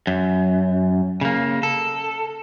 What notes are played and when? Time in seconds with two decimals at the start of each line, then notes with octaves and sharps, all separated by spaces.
0.07 F#2
1.21 C#3 A#3
1.63 A4